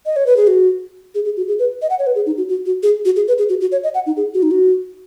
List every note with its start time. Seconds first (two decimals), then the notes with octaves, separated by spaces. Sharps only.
0.06 D#5
0.16 C#5
0.26 B4
0.37 G#4
0.47 F#4
1.15 G#4
1.25 G#4
1.37 F#4
1.48 G#4
1.59 B4
1.82 D#5
1.90 F#5
1.99 C#5
2.07 B4
2.15 G#4
2.26 D#4
2.38 F#4
2.49 F#4
2.66 F#4
2.83 G#4
3.05 F#4
3.16 G#4
3.28 B4
3.38 G#4
3.49 F#4
3.61 F#4
3.72 C#5
3.84 D#5
3.94 F#5
4.06 D#4
4.17 G#4
4.34 F#4
4.43 D#4
4.51 F#4